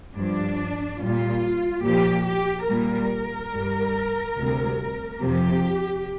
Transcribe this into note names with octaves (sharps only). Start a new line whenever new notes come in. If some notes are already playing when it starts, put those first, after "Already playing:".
G2 F3 D4
A#2 G3 F4
A#2 F3 G4
G4
A#2 G3 A#4
G2 G3
D2 C3 G3
F2 C3 F3 G4